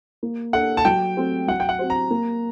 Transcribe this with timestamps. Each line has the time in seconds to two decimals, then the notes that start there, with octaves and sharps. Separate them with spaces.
0.23 A#3
0.53 D4 A4 F#5
0.77 A5
0.85 F#3 G5
1.17 A3 C4 F#4 C5
1.48 F#3 F#5
1.60 G5
1.69 F#5
1.79 C4 F#4 C5
1.90 A#5
2.11 A#3